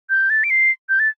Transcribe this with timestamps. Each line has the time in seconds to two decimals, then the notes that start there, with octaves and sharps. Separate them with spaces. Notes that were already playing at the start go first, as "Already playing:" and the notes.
0.10 G6
0.30 A6
0.44 D7
0.50 C7
0.89 G6
0.99 A6